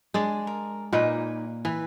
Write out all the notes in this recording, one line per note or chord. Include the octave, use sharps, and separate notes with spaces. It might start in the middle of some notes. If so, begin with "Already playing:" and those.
G#3 D4 D5
A#4
A#2 A#3 D#4 B4 G#5
E3 B4